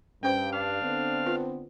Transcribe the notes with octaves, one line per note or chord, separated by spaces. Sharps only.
G2 C#4 C5 G5
D4 F5
D3 B3 C4
F4 B4